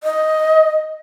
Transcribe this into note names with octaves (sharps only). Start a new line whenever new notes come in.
D#5